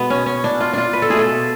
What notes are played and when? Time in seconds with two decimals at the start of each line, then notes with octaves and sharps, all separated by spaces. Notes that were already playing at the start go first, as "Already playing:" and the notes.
Already playing: B2 G#3 B3
0.10 C#4
0.26 C#4
0.44 D4
0.61 F4
0.73 D4 F4
0.93 B4
1.02 A4
1.10 B2 A3 G#4
1.19 A4